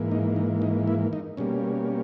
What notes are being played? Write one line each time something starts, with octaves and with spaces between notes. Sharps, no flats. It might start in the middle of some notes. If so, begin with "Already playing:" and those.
Already playing: G#2 E3 A#3
D#4
D#4
D#4
E4
D#4
B2 G3 A#3 C#4